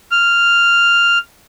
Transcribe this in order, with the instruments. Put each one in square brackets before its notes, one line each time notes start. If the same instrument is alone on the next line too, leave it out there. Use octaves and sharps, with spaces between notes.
[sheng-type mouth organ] F6